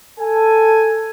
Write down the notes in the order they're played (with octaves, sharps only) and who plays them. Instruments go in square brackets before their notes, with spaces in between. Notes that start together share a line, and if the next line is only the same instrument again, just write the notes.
[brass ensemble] A4 G#5